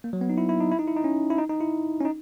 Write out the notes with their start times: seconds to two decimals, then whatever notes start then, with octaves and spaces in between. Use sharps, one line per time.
0.04 A#3
0.13 F#3
0.21 B3
0.29 D#4
0.38 E4
0.49 E4
0.60 D#4
0.71 E4
0.79 D#4
0.88 E4
0.97 D#4
1.04 C#4
1.30 E4
1.38 D#4
1.49 D#4
1.61 E4
2.01 C#4
2.05 D#4